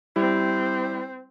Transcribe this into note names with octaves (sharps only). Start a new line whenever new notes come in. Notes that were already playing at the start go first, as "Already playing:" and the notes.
G3 C4 E4